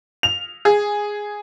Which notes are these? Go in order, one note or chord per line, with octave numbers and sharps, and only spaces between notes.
F7
G#4